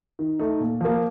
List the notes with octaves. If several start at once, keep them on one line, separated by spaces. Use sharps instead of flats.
D#3
A3 D#4
A#2
F3 A#3